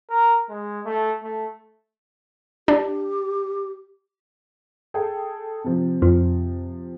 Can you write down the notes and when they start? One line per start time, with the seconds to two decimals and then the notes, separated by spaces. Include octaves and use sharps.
0.10 A#4
0.49 G#3
0.85 A3
1.23 A3
2.68 D4 G4
4.94 G#4 A4 G5
5.64 C3 F3
6.02 F2